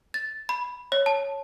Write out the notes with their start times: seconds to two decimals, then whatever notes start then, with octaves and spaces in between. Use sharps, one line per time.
0.14 A6
0.49 B5
0.92 C#5
1.06 A5